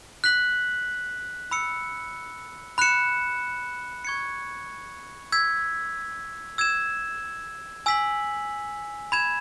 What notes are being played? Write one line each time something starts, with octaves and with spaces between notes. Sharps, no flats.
F#6 B6 F#7
B5 E6 C#7
B5 F#6 C#7 E7
C#6 G#6 C#7
E6 G#6 B6
E6 G#6 E7
G#5 E6 B6 F#7
B5 G#6 E7